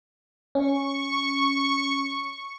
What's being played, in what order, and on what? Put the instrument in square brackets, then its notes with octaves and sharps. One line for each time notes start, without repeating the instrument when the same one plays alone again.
[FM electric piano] C#4 [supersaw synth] C#6